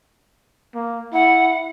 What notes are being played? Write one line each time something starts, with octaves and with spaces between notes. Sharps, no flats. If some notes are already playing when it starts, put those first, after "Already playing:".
A#3
E4 F#5